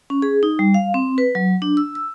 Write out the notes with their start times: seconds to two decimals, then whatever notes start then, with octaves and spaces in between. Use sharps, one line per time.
0.10 C#4
0.22 G#4
0.43 D#4
0.59 G3
0.74 F5
0.94 C4
1.18 B4
1.35 F#3
1.62 D4
1.77 E6
1.95 E6